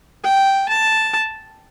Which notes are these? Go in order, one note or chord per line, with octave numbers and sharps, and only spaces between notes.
G5
A5